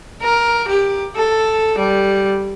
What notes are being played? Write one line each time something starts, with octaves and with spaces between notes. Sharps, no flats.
A#4
G4
A4
G3